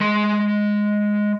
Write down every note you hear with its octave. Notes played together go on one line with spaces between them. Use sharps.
G#3 C6